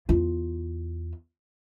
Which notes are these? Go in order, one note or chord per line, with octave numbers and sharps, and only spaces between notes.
E2 F4